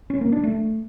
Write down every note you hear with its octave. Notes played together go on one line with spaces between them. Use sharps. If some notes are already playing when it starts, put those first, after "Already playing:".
C#4
A#3
D4
A3